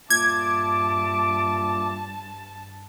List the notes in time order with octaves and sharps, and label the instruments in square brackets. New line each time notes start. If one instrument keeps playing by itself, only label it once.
[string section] G2 A5 [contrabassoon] A#2 [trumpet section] E5 D6 [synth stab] G#6